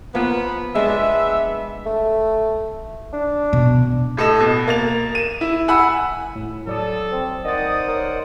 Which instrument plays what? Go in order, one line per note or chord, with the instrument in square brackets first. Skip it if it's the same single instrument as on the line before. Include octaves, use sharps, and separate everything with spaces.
[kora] F3 A#3 [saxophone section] B3
[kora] G#3 D4 [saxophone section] B3 E5
[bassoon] A3
D4
[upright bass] B2
[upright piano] A2 A4 D#5 E7
B2
A#3 A6 F7
D#7 E7
E4
F#5 G#5 B5 E6
[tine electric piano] A2
[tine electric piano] F#3 D5 D#6 [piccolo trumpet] A4
[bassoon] C4
[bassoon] D#3 [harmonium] C5 D5 F#5 [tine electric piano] D#5 A6 [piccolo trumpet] D#6
[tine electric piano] A#4 C#5 D#5